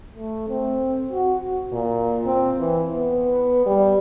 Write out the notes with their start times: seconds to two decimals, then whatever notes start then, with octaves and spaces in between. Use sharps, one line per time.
0.16 A3
0.49 C4
1.13 F#4
1.72 A#2
2.26 C4
2.60 E3
2.94 B3
3.66 G3